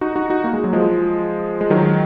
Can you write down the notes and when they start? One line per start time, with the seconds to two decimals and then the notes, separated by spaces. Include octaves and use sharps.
0.01 D#4 F#4
0.16 D#4 F#4
0.30 D#4 F#4
0.44 A#3
0.53 G#3
0.64 F#3
0.73 F3 G#3
1.61 G#3
1.70 D#3 F#3